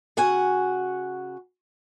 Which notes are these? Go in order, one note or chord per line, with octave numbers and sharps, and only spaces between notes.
C#3 F#4 F#5 G#5